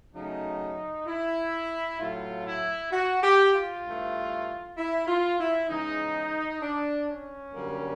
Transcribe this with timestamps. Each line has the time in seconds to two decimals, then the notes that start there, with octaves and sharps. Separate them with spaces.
0.15 C#3 F#3 A3 D#4
1.07 E4
2.00 A2 F#3 A3 F4
2.46 E4
2.92 F#4
3.23 G4
3.53 F4
3.85 G2 E3 A3
4.77 E4
5.08 F4
5.39 E4
5.69 C#3 E3 G#3 D#4
6.61 D4
7.08 C#4
7.54 F#2 D3 G3 A#3